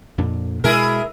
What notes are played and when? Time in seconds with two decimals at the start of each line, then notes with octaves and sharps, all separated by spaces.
0.18 F2 A#2 D4
0.64 B2 G#3 E4 G#4 A#4